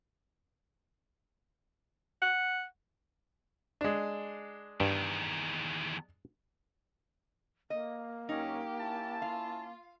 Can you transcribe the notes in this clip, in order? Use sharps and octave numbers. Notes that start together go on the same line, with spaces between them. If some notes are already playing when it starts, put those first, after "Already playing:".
F#5
G#3 D4
E2 G2 D#3
A#3 D#5
F#2 C#4 D#4 G4
C#4 E4 A5
F4 F5